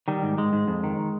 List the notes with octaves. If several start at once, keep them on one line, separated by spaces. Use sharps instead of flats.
D#3 G3
G#2
G#2 G#3
G#2
F2
D#3